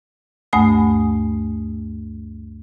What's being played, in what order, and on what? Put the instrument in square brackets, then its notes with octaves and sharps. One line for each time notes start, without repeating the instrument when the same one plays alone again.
[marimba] D2 G2 A3 G#5 D#6